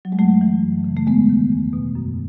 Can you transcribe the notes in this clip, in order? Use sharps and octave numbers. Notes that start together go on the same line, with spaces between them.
F#3
G#3
F#2 F#3 A3
E3
F#2
C#3 E3
A3
E2 G#3 B3
D#3
E2
B2
F#2